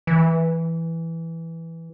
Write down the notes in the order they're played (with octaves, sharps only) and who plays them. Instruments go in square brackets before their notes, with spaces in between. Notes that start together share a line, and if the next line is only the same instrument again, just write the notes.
[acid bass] E3